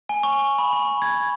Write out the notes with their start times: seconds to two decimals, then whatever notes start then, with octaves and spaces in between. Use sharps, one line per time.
0.09 G#5
0.23 C#6
0.58 B5
0.73 B5
1.02 G#6